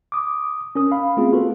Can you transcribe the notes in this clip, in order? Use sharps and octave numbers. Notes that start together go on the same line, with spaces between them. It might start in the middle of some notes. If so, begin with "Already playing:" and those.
D6 D#6
C#4 A#4 D#6
F5 B5
A3 B3 C4 F4 G#4
F4 F#4 A4 B4